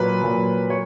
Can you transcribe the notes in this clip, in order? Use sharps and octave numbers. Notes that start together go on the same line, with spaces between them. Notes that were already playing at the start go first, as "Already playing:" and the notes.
Already playing: A#2 F#3 B4
A#2 F#3
F#3 C#5